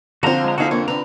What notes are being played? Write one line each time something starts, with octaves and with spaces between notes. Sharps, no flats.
D3 F3 C4 F#4 C5 F5 A#5
G#3 A#5
D2 D#4 F#4 G#4 A4 F5
F2 A#3 D4 C#5
D4 B4 A#5